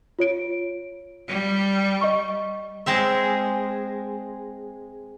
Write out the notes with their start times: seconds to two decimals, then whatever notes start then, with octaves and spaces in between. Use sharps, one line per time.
0.19 F4 C#5 D7
1.29 G3
2.01 D#5 C#6
2.86 G#3 C4 E5